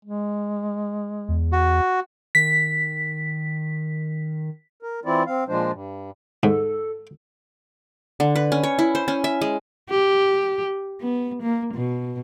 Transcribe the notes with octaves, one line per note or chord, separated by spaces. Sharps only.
G#3
E2
F#4
D#3 B6
A#4
E3 C4 E4 F4 D5
C4 F5
A#2 F3 G#3 D4 C5
G2
G#2 A4
D3
B4
C#4
C#5
E4
C5
C#4
E5
G#3
G4
B3
A#3
B2